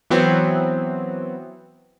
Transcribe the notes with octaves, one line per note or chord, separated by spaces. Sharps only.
E3 F#3 B3 C4